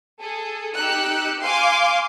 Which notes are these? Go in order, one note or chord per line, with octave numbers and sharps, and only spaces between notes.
G#4 A4
D#4 G4 E6 F#6 C#7
F5 G#5 C6 D6